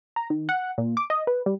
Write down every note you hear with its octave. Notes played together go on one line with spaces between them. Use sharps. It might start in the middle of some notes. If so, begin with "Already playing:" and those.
A#5
D#3
F#5
A#2
D6
D#5
B4
G3